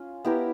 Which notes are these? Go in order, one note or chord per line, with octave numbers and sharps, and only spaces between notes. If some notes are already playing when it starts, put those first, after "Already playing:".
Already playing: C#4 F4
B3 E4 G4 A#4